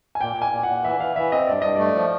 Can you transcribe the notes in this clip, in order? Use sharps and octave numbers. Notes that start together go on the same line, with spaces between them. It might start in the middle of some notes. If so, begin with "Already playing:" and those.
G#5
A#2 G5
A#2
G#5
A#2
A#2 F#5
E3 E5
E3 F5
E3 E5
C4 D#5
G2 D5
G2 D#5
A3 D5
F3